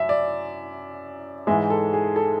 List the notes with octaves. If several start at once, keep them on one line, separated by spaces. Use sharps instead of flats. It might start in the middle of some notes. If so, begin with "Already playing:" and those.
Already playing: F#2 E5
D5
G#2 E3 G#3 E5
A4
G#4
A4